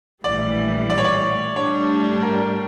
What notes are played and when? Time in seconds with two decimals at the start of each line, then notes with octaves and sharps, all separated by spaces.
0.24 A#1 A2 E3 G3 D5
0.90 D5
0.98 C#5
1.04 D5
1.56 A2 G3 D4 C#5
2.22 A#4